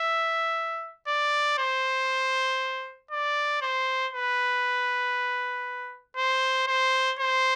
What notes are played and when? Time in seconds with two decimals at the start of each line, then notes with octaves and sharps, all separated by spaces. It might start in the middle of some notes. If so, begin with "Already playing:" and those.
Already playing: E5
1.08 D5
1.58 C5
3.11 D5
3.62 C5
4.13 B4
6.17 C5
6.67 C5
7.19 C5